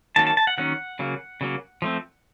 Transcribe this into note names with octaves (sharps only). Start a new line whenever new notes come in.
D#3 F#3 A#3 C#4 A5
A5
A5
F#5
D#3 F#3 A#3 C#4 F#5
C#3 F#3 A#3
C#3 F#3 A#3
F3 A3 C4